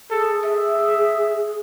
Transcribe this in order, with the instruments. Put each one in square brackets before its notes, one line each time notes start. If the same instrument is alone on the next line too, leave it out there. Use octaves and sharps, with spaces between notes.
[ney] G#4 [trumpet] A4
[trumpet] E5